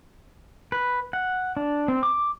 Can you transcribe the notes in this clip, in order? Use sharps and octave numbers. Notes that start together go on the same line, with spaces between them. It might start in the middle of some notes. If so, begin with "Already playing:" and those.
B4
F#5
D4
C4
D6